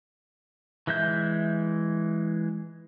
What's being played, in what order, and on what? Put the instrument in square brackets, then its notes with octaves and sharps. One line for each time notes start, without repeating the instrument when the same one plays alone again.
[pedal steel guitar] E3 G#3 E5 G6